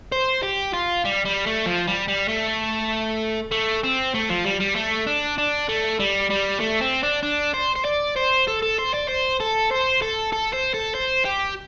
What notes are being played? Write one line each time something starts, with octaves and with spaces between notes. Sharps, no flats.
C5
G4
F4
G3
G3
A3
F3
G3
G3
A3
A3
C4
A3
F3
G3
G3
A3
D4
D4
A3
G3
G3
A3
C4
D4
D4
C5
C5
D5
C5
A4
A4
C5
D5
C5
A4
C5
A4
A4
C5
A4
C5
G4